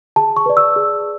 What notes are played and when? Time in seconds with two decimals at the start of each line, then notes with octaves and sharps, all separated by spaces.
0.16 G#4 A5
0.37 C#6
0.46 B4 D5
0.57 E6
0.76 G#4